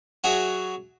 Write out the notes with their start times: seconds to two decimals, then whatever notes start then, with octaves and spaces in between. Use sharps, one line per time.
0.24 F#3 F#4 G#4 E5